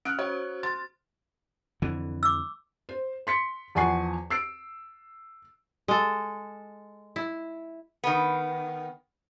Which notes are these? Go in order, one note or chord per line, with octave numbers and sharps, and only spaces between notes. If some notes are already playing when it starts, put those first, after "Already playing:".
C#4 F6 F#6 D7
F#4 C5 C#5
C6 A6
F2 D3 E3
D6 E6
C5
C6 B6 C#7
E2 F3 F#5 G#5 C#6 C7
E6 C7 D7
G#3 A4
E4
D#3 B3